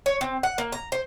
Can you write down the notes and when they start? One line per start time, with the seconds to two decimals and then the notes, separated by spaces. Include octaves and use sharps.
0.06 C#5
0.21 C4
0.43 F#5
0.58 A#3
0.72 A#5
0.92 C5